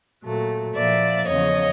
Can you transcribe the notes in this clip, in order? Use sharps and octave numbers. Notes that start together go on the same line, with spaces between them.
A#2 F#3 A3
A#2 F3 A#3 D5 E5
E2 C#3 F3 C#5 D#5